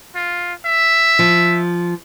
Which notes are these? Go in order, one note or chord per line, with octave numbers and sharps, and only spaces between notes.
F4
E5
F3